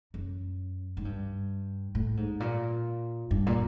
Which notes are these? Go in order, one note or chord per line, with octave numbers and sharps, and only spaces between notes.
F#2
G#2
G2
A2
G#2
A#2
G2
A#2